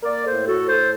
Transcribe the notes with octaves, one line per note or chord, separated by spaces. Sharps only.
A#3 A#4 D5
A4 C5
A2
F#4 A4
A2
A4 C5